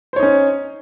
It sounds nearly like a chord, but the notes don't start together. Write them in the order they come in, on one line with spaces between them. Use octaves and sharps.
C5 C#5 D#4 C#4